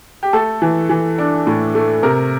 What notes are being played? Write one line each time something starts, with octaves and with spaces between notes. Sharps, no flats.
G4
A3 A4
E3
E3
D4
A2
A3
C3 A#4